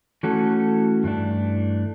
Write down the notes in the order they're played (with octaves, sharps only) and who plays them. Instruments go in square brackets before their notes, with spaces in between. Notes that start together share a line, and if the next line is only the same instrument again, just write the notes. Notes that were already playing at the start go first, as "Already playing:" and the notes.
[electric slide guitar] E3 A3 C#4 F#4 A4
G2 E3 A3 D4